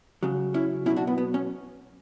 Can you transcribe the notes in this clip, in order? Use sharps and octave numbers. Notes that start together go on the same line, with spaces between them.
C#3 F#3
C#4 E4
B2 F#3 C#4 E4
D4 F#4
B3
B3
C#4